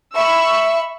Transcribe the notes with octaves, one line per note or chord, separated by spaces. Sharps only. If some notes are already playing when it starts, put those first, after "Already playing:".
E5 B5 C#6 E6